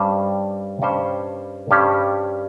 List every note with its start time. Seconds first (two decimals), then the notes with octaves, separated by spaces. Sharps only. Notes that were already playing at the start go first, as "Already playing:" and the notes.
Already playing: G2 G3 C#4 G4 C5
0.82 G2 G3 C#4 G4 C5
1.71 G2 G3 C#4 G4 C5